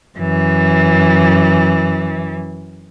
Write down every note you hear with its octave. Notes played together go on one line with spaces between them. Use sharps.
F#2 E3